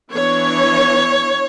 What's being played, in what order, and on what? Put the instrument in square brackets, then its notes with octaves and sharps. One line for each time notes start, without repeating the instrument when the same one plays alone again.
[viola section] E3 B3 D4 C#5